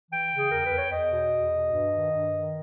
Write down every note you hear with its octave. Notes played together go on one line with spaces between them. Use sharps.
E3 G5
C#3
G#4
E2 A#4
B4
E2
C#5
E2 D#5
B2
E2
B2
G2
D#3
G2
D#3